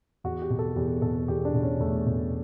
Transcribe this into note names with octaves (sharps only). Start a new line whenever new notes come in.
E2 F#4
G4
B2
A4
E2 G4
B2 A4
E2 G4
D4
B2
C#4
E2 A3
B2